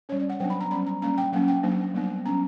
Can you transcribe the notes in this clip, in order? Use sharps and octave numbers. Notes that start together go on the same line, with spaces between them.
G3 C#4 C#5
D5
F#5
F#3 B3 D4 G5
B5
A#5
G3 C#4 B5
A#5
G3 A#3 C#4 A#5
G5
F#3 A#3 C#4 F#5
G5
F#3 A#3 D4
G3 B3 D4
F#3 C#4 A#5